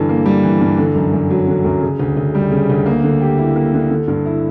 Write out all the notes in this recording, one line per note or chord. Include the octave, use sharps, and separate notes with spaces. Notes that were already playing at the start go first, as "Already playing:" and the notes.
Already playing: G2 D3 E3
A#3
G3
E3
G2
D3
F#2
F#2
F#3
D3
F#2
C#3
D2
D2
G3
C#3
D2
A#3
D3
G4
E4
A#3
D3
D3
G2
E4